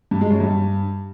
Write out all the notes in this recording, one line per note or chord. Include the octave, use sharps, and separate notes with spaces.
G2
G#3
F#2
G2